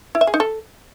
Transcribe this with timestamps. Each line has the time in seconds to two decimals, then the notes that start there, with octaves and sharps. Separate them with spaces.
0.15 E4
0.21 E5
0.27 G#4
0.34 D#4
0.40 A4